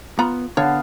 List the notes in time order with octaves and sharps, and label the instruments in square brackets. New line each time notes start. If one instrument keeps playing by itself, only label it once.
[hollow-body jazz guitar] B3 [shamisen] F4 A#5 B5
[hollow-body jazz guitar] D3 [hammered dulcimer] B3 F5 A5 [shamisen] C#5